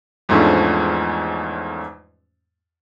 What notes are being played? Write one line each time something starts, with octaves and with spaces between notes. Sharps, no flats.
E2 G#2 F3 A3 C#4 D4